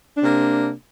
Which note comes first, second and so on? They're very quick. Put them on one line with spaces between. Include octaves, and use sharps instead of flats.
D4 C3 A#3